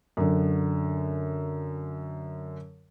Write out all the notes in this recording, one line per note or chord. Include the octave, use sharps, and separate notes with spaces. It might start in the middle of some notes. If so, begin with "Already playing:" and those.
F#2 D3